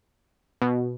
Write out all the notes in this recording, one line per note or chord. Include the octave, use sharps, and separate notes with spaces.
B2